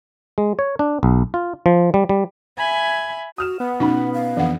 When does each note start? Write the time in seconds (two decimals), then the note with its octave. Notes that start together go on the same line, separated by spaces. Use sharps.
0.38 G#3
0.59 C#5
0.79 D4
1.03 B1
1.34 F4
1.66 F3
1.94 G3
2.09 G3
2.58 E5 G#5 B5 G#6
3.38 F#4 D#6 F6 E7
3.60 B3 F#5
3.80 B2 C#4 D#4 B5
4.14 F5
4.37 F2 D3 E3 F#5